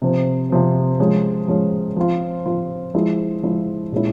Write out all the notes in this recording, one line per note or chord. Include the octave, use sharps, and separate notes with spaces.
C3 F3 C4
C3 F3 C4
F3 G#3 C#4
F3 G#3 C#4
F3 C4 F4
F3 C4 F4
F3 G#3 E4
F3 G#3 E4
A#2 G#3 C#4 E4